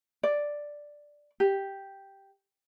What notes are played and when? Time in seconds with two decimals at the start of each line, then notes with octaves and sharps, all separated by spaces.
0.23 D5
1.40 G4